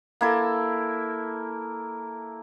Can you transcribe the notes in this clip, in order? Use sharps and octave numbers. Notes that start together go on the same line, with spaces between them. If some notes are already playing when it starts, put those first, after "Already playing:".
A#3 E4 A4